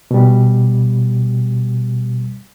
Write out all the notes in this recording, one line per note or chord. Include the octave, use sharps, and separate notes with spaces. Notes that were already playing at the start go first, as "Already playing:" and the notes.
B2 G3